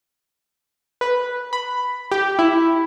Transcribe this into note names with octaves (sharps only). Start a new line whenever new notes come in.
B4
B5
G4
E4